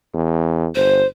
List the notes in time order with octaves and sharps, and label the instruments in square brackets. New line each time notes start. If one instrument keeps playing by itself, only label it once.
[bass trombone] E2
[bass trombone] G1 [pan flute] C5